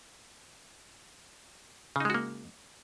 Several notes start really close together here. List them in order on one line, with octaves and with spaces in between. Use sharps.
C#3 D#4 G#3 F#4 A#3